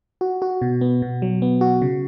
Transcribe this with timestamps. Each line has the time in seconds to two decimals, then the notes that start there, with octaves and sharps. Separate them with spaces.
0.21 F#4
0.42 F#4
0.62 B2
0.81 B3
1.02 B2
1.22 F#3
1.42 B3
1.61 F#4
1.82 C#3